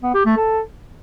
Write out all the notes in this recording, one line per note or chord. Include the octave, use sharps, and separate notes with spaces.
B3
G4
A3
A4